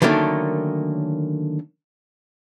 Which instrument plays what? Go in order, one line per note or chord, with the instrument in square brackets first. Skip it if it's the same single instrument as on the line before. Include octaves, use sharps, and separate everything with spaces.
[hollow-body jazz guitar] D3 D#3 F#3 A3 A#3 C#4